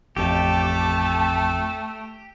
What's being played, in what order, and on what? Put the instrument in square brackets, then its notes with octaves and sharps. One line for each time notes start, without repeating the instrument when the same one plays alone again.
[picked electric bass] A1 F2 [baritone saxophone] A3 [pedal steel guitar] G4 [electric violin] A5